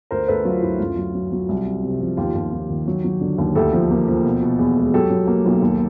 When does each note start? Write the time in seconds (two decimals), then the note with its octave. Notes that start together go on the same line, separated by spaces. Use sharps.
0.11 D2 A#4 C5
0.28 D2 A4 B4
0.45 F#3 F4
0.62 D2 E4
0.79 F#2 F4
0.97 F#3
1.14 F#3
1.32 F#3
1.49 C2
1.67 C3
1.83 C3
2.00 F3
2.17 D#2 F4 G4
2.35 D#2
2.53 D#2
2.70 D#3
2.87 F#3
3.04 F#3
3.21 D3
3.38 D#2
3.55 D2 G4 A4
3.73 F3
3.91 A#3
4.08 F3
4.24 B2
4.42 B2
4.59 E2
4.77 G#3
4.94 F#3 G4 A4
5.10 F#3
5.27 A#3
5.46 B1
5.62 D#2